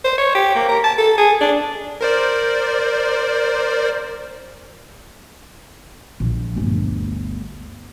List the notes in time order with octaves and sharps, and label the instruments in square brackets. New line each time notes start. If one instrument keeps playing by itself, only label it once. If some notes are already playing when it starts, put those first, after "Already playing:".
[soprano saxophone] C5
C#5
G4
A#3
A#4
A5
A4
G#4
D4
[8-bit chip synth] A#4 C5 D5
[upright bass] A#1
G1 D2